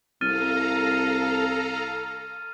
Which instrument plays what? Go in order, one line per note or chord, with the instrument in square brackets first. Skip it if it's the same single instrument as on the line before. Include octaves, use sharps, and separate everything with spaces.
[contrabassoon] C2 [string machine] A4 F5 A#5 [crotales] F6 A6 D#7